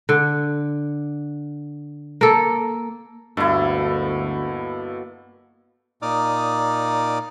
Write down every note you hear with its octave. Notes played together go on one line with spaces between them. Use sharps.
D3
A#3 A4
D2 G2 B2 A#3 B3 E4 A4
A#2 D#4 D5 D6 D#6 F6